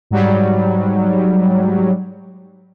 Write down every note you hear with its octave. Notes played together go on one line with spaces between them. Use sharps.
G#2 F#3 G3